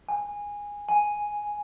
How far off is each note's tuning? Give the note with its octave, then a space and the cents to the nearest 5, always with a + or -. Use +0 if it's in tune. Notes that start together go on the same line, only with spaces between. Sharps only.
G#5 -15
G#5 +0